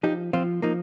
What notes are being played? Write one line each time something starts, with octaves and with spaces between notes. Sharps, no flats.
F3 D#4 G4
F3 C4 F4
F3 A#3 D#4